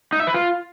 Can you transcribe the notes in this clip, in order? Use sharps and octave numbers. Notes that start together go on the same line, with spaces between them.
D#4
E5
B4
F4